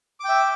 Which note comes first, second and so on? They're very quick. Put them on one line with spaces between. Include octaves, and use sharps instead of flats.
D6 G5 E5